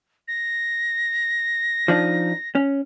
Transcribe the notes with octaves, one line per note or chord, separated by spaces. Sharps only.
A#6
F3 D4 D#4
C#4